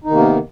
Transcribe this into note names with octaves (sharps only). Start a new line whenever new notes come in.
C3 D#3 A#3 B3 D#4